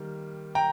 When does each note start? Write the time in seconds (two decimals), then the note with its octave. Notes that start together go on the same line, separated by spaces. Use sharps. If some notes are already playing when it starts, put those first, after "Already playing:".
Already playing: D#3 G3 A#3
0.55 G5 A#5